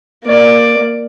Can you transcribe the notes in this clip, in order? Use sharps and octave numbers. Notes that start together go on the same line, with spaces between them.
A#3 D5